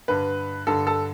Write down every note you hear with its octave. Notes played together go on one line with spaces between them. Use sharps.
G2 D3 B4
G2 D3 A4
A4